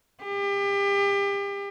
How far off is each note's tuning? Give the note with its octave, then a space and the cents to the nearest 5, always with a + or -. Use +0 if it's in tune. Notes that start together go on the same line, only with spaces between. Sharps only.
G4 +35